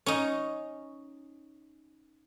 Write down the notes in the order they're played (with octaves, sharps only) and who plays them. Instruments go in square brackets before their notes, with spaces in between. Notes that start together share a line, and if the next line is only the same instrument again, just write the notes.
[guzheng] C#4 D#4